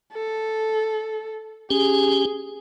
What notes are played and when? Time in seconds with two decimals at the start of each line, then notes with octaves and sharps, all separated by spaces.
0.13 A4
1.71 C#4 G4 G#4